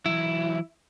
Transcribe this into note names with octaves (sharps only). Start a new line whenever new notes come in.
E3 F#3 E4